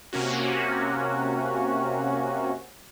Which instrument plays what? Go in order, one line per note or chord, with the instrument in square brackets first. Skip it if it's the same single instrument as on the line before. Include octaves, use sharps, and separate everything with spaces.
[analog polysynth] C3 A#3 C#4 F#4